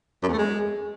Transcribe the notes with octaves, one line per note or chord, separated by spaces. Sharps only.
F#2
E2
A3
G#3